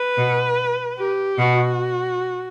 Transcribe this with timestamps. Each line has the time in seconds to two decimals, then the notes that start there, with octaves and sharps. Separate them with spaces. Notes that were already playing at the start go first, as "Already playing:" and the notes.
Already playing: B4
0.18 B2
0.99 G4
1.39 B2 F#4